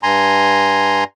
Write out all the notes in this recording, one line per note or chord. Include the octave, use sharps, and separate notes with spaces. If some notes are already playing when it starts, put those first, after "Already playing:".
G2 G#5 A#5 C6